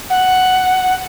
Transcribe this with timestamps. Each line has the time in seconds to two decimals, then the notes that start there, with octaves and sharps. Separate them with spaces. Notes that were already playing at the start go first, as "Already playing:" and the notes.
0.09 F#5